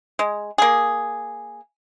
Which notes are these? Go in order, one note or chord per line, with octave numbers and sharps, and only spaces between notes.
G#3
A#3 G#4